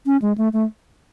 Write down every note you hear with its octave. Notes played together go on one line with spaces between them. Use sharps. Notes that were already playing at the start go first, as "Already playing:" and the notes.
C#4
G#3
A3
A3